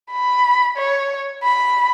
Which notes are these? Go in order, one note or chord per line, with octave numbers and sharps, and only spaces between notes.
B5
C#5
B5